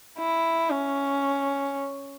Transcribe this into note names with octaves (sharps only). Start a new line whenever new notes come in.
E4
C#4